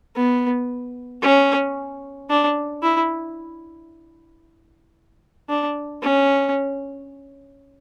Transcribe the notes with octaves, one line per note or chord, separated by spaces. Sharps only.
B3
C#4
D4
E4
D4
C#4